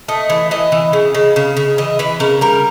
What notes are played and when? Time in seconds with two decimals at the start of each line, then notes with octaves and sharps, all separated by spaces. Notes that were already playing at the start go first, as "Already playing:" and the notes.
0.08 A3 D#5
0.29 E3
0.51 E3 D#5
0.72 E3
0.93 C#3
1.15 C#3
1.36 C#3
1.57 C#3
1.78 E3 D#5
1.99 E3 B4
2.20 C#3 A#4
2.41 G3 A#4